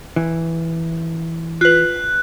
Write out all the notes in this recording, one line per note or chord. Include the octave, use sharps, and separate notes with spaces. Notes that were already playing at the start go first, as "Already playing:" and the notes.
E3
F4 B4 F#6